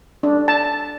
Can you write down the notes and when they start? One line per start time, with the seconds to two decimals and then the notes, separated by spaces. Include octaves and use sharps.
0.23 D4
0.48 A5